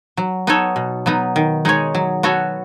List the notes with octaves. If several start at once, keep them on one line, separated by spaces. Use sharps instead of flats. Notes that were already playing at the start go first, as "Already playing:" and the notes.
F#3
B3 D#4 A4 C#5
B2
F#3 B3 D#4
D#3
G#3 D#4 G#4 C#5
F#3
B3 F#4 A4 C#5